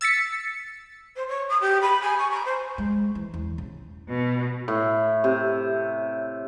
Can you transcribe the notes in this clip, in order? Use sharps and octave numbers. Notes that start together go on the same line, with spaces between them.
E6 A6 B6 C#7
C5
C#5
D#6
G4
B5
G#5
C#6
A#5
C5
G#3
E3
E2
C#3
B2
A2
C3